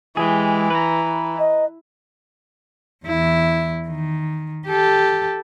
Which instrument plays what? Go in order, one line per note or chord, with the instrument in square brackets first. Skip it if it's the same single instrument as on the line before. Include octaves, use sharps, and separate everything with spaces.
[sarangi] E3 [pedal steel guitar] G#3 G4 G#4
[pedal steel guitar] B4 A#5
[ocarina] D#5
[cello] E2 E4
D#3
G4 A4